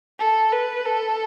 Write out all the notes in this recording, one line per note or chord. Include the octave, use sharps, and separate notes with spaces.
A4
B4
A4